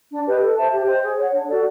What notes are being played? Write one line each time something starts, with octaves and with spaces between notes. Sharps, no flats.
D4
G4 B4 D#5
A4
C5 E5 A5
G4
C5 D#5 G5
G#4
C#5 F#5
D4
F#4 A4 D5